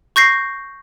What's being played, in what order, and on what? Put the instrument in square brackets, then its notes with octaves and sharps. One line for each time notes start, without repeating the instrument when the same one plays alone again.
[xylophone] C#6 G6 A#6 C7